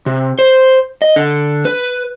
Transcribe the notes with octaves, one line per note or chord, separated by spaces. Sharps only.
C3
C5
D#5
D3
B4